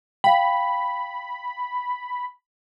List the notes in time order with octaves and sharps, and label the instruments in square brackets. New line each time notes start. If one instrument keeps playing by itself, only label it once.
[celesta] F5 G5 [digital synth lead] B5